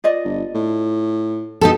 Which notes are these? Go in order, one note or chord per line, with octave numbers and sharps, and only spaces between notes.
F4 D5 D#5
G1
A2
B2 D#4 G4 A4